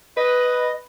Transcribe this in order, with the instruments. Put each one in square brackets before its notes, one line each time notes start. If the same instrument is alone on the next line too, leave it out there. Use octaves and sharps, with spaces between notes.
[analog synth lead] B4 [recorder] D#5